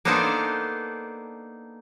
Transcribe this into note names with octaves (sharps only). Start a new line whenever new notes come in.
A#3 B3 D4 D#4 A4 C5